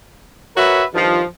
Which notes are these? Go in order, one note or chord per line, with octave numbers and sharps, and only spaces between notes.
F#4 A#4 B4 C#5 E5
G2 D#3 F3